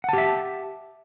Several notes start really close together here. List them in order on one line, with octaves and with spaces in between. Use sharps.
F#5 A5 G4 E5